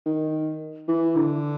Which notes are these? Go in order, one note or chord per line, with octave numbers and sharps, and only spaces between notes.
D#3
E3
D3